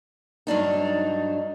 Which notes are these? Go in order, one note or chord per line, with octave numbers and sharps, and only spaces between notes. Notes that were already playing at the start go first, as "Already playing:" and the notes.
G2 F#3 D4 D#4